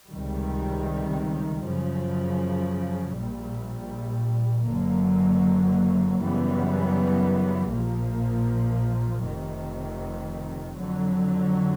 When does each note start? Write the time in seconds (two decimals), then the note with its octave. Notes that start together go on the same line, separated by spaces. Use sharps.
0.11 C#2 C3 D#3 G3
1.64 F#2 C#3 F3
3.16 A#1 A#2 G3
4.68 F#1 F#2 D3 F#3 A#3
6.21 F#2 C#3 E3 G3 B3
7.73 A#1 A#2 F3 A#3
9.25 F1 F2 C3 D#3
10.78 F2 D3 F#3